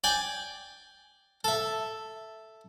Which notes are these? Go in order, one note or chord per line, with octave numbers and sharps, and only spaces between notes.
D5 G5 G#5
A4 E5